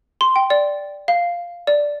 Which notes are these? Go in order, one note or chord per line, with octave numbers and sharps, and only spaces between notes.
C6
G5
D5
F5
D5